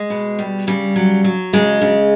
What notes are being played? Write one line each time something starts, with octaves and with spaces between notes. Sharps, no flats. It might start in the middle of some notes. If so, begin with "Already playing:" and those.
Already playing: G#3
B2
G3
C#3 G3
F#3
F#3
C#3 G#3
C#3